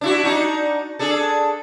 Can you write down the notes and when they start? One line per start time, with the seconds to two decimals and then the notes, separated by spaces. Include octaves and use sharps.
0.01 D4 E4 F#4
0.23 D4 D#4 F#4
0.99 D4 G#4 A4